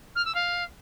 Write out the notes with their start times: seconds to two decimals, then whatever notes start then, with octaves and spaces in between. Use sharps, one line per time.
0.15 F6
0.25 E6
0.34 F5